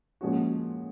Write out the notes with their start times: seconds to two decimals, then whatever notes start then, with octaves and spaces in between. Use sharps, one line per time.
0.21 A#2 F3 G#3 C#4 F#4